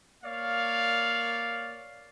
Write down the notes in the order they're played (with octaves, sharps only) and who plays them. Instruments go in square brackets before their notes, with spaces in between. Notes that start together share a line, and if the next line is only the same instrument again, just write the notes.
[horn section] A#3 C#5 D5 F5